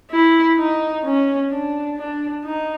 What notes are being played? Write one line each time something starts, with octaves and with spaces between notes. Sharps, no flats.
E4
D#4
C#4
D4
D4
D#4